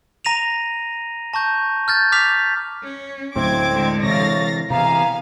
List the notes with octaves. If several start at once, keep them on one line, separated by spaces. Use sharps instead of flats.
A#5 A#6 D#7 F7
A5 C#6 G6
F6 G6 A6
D6 F6 B6 F7
C#4
D2 A2 F#3 C4 D6 G#6
D3 G#3
C3 E3 C#5 F5 A6 A#6
C3 E3 B3 F5 G#5 A#5